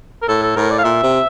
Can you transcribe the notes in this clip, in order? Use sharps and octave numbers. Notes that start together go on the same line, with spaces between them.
A#4
A2 A4
A4
A2 A#4
D5
F5
A#2 E5
C3